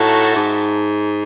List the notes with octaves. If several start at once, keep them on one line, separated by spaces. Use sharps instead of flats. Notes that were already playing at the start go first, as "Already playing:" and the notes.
Already playing: A2 D#4 F#4 A4 E5 A5
G#2